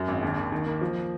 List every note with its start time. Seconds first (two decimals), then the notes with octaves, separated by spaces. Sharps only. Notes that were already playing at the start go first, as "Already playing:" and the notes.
Already playing: F#2
0.08 G#1
0.22 D#2
0.37 D#2
0.52 D#3
0.66 A#3
0.81 F3